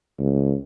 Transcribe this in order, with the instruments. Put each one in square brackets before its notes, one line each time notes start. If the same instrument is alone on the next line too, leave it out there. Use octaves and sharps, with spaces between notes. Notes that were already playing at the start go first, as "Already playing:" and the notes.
[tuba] C#2